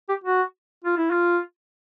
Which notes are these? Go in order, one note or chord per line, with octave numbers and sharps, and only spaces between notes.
G4
F#4
F4
E4
F4